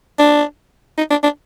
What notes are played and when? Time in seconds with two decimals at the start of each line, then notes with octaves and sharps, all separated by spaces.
0.19 D4
0.98 D#4
1.10 D4
1.23 D4